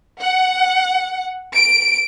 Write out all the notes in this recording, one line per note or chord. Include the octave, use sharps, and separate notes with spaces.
F#5
D7